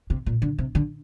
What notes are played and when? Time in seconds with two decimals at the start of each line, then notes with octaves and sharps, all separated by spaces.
0.10 C3
0.26 A#2
0.42 D3
0.58 C3
0.75 D3